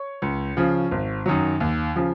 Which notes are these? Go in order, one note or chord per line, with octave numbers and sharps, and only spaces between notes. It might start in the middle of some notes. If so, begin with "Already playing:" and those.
Already playing: C#5 C#6
C#2
C#3 F3
G#1
F#2 D#3 F#3
D#2
C#3 F3